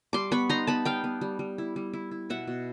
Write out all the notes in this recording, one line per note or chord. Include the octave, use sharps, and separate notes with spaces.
G3 C6 D6
B3 B5 C#6
D#4 A#5 C6
B3 A5 B5
G3 F5 G5
B3
G3
G3
E4
G3
E4
E4
B2 E5 F#5
B2